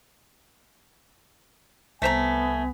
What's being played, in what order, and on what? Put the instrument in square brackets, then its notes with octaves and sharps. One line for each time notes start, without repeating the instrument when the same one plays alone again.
[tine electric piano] C2 B6 [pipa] A3 C5 A#5 [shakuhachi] B3 [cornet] G#5